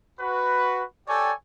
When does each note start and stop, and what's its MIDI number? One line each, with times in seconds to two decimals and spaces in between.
0.20 0.83 66
0.20 0.83 71
1.08 1.32 67
1.08 1.32 69
1.08 1.32 73
1.08 1.32 74
1.08 1.32 79
1.08 1.32 80